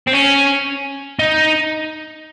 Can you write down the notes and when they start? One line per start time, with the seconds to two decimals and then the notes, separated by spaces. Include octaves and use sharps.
0.08 C4
0.14 C#4
1.19 D#4